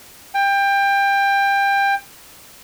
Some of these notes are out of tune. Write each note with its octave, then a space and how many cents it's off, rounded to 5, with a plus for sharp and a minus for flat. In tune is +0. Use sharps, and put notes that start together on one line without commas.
G5 +25